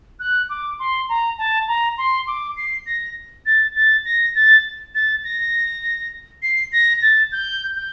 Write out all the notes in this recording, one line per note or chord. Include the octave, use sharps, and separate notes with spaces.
F#6
D6
C6
A#5
A5
A#5
C6
D6
C7
A#6
A6
A6
A#6
A6
A6
A#6
C7
A#6
A6
G6
G6